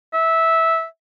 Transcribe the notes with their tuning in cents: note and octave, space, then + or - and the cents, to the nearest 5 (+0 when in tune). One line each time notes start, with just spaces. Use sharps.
E5 -10